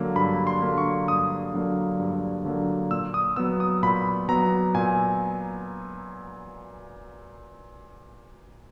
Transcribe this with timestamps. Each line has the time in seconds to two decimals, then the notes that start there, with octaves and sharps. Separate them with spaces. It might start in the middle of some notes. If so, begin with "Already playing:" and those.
Already playing: D3 F#3 A#3
0.16 G2 B5
0.47 C6
0.62 D3 F#3 A#3
0.78 C#6
1.08 G2 D#6
1.54 D3 F#3 A#3
2.00 G2
2.45 D3 F#3 A#3
2.91 A#2 E6
3.14 D#6
3.36 F#3 B3 E6
3.60 D#6
3.83 A#2 B5
4.29 F#3 B3 A#5
4.75 A#2 G#5